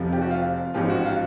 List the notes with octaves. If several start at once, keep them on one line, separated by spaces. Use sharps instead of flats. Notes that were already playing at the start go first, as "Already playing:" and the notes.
Already playing: F1 F2 C3 F3
G4
F#4
F4
A1 G#2 F3 G4
F#4
F4